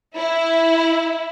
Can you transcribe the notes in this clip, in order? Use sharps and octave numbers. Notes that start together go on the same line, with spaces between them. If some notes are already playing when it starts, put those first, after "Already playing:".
E4